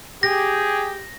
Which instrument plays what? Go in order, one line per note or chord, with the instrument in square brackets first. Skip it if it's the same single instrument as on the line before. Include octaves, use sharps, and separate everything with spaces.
[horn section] G4 [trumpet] G#4 [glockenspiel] A#6